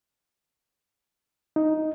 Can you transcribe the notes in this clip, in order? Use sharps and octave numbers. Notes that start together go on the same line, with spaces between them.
D#4